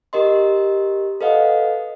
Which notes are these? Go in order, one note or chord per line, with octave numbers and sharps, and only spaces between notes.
G4 A#4 D#5 C6
A4 B4 D#5 F5 F#5